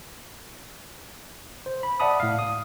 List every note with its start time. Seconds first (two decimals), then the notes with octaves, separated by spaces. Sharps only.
1.66 C5
1.83 B5
2.00 D5 E5 F#5 A5 B5 D#6
2.20 A2 F5
2.39 D#6